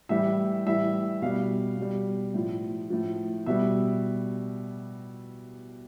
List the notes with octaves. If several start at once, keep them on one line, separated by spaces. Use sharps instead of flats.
A2 E3 G3 E5
A2 E3 G3 E5
B2 G3 F5
B2 G3
A2 F3
A2 F3
B2 G3 E5